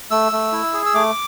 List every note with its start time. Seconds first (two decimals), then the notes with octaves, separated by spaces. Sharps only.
0.11 A3 E6
0.32 A3
0.52 E4
0.73 G#4
0.86 E6
0.94 A3 D6